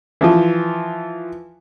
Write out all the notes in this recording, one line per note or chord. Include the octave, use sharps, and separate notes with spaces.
E3 F3 F4